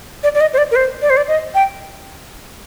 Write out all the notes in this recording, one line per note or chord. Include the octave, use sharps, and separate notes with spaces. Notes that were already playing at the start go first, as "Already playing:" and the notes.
D5
D5
D#5
C5
D5
A#4
C5
D5
C5
D5
D#5
G5